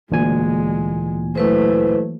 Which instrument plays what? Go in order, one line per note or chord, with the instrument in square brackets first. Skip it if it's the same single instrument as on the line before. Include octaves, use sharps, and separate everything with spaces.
[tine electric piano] D2 A#2 G#5 [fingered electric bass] E3 A#3 [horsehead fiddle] G#3
[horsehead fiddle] F#3 A3 [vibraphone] E4 B4 C5